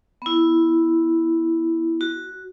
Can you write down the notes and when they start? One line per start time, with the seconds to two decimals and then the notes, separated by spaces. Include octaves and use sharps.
0.22 B3 E4
2.01 F#4